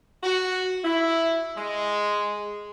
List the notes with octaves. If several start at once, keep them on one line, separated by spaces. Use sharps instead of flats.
F#4
E4
G#3